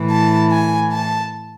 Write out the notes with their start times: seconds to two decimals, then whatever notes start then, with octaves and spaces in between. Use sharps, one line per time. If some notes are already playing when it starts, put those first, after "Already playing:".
Already playing: A2 E3
0.10 A5
0.51 G#5
0.91 A5